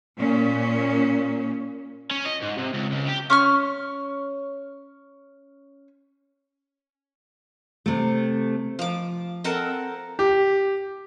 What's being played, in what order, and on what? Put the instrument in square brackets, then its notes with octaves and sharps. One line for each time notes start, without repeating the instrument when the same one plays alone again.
[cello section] A#2 C#4
[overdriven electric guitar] C#4
D#5
G#2
C3
C#2
C#2
G4
[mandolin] C#4 C#6 F6
[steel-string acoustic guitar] C3 A3
[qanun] F3 D6
C4 A4 A#4 F#5
[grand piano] G4